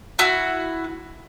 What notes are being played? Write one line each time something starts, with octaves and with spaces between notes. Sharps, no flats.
E4 F#4